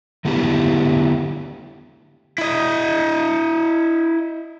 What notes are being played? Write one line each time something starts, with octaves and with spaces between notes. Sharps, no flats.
D3 A3 B3 E4 G4
E4 D#5